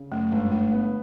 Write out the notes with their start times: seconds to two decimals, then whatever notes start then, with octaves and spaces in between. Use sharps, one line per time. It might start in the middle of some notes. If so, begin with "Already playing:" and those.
Already playing: C#3
0.11 F#2 A3
0.31 G1 G#3
0.51 G1 A3
0.72 B3